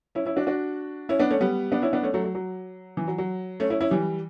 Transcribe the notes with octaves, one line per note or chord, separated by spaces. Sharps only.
C#4 E4
C#4 E4
D4 F#4
D4 F#4
C#4 E4
B3 D4
A3 C#4
G3 B3
B3 D4
C#4 E4
B3 D4
A3 C#4
F#3 A3
F#3
F#3
E3
F#3
F#3
A3 C#4
C#4 E4
C#4 E4
E3 G3